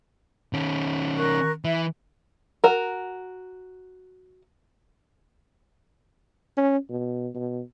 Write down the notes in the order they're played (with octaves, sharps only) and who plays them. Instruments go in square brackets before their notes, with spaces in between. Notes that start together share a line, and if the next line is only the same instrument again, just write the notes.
[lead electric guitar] D#3 C#4
[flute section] A#4 C#6 F#6
[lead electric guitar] E3 [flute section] E5
[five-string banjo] F#4 A#4
[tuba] C#4
B2
B2